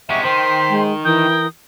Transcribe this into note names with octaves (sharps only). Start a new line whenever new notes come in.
C3 G#3 E5 F#5 C#6 B6
D#3 C5 G5 C6
G#3
E3 A#4 G5 D#6